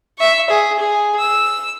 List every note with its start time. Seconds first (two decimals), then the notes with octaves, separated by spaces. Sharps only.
0.18 E5 C#6
0.50 G#4
0.79 G#4
1.19 E6